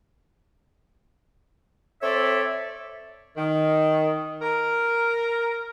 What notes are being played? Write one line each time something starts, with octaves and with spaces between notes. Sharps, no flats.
C4 A4 C#5 D5 E5
D#3
A#4